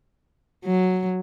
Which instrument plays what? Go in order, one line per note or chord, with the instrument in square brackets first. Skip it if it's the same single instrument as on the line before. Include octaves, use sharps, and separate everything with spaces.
[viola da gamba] F#3